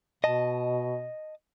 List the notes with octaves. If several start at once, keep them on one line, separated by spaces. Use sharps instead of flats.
B2 D#5 A5